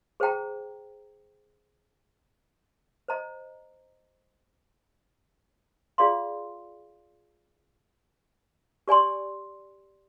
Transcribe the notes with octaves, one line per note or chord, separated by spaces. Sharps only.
G#4 C5 G5 A#5
C5 D#5 A#5
F4 G#4 D5 F5 C6
G4 D5 G#5 C6